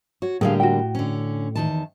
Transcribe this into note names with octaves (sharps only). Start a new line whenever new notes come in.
F#4 C#5
A2 D3 G3 A#3 G#4 F5
F#4 G5
D3 C#4
E2 D#3 A5